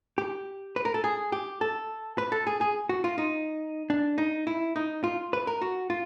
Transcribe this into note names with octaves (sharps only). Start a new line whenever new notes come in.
G4
B4
A#4
A4
G#4
G4
A4
B4
A4
G#4
G#4
F#4
F4
D#4
D4
D#4
E4
D#4
F4
B4
A#4
F#4
F4